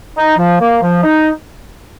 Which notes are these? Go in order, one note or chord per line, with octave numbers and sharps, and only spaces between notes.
D#4
F3
A#3
F3
D#4